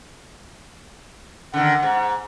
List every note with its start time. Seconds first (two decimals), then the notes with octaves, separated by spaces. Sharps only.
1.54 D3 D#3 F#5
1.83 G#2